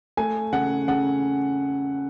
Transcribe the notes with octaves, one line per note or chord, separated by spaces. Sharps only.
A3 G#5
C#3 F#5
C#3 F#5